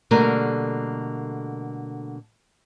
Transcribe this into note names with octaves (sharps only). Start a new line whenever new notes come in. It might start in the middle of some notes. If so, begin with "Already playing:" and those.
B2 D3 G3 A3 A#3 A#4